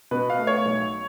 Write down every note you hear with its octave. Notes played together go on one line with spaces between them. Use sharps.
B2 B4
F5
A3
C#5
B1